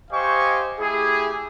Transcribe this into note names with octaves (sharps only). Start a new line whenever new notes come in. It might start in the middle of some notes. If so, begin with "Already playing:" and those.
G4 C5 D#5 F5 G#5 C#6
A3 E4 G4 G#4